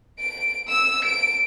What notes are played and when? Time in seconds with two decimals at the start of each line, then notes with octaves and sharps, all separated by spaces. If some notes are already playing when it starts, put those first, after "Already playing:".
0.19 D7
0.68 E6
1.04 D7